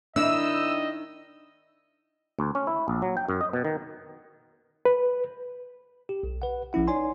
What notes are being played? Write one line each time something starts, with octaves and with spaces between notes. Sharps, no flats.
D#3 D4 E4 D#5 E6
D2
C#4
E4
A#1
F#3
G5
F#2
D#5
B2
D#3
B4
G4
B1
B4 F#5
A#1 F3 C#4 E4 F#5
D#4 C#5 D5 G#5 C6